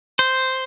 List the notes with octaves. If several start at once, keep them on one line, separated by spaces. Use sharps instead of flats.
C5